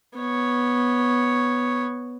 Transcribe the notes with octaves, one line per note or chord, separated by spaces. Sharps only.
B3 C#5